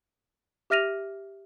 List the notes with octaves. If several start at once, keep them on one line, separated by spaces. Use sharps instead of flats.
G4 E5 F6 A#6 D#7 F7